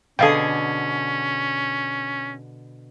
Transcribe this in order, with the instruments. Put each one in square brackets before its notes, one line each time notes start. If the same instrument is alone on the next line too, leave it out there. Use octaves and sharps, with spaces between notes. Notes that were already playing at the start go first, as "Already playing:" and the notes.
[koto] B2 D3 G#4 [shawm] C#4 [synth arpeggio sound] A4 F5 G5